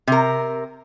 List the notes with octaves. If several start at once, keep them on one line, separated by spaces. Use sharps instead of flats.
C3 A#4